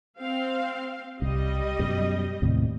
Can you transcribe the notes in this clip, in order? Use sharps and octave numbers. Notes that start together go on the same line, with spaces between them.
C4 F5
C2 G3 D#5
F#2 B2
D#2 A2 C3